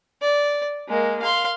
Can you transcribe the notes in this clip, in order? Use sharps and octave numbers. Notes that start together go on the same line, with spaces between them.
D5
G#3 A#3
F5 C6